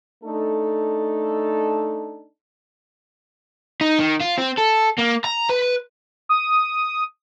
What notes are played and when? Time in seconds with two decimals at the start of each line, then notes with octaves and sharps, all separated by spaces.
0.24 A3 D4 D#4 A4
3.81 D#4
4.00 D#3
4.21 F4
4.39 C4
4.58 A4
4.99 A#3
5.25 A#5
5.50 B4
6.29 D#6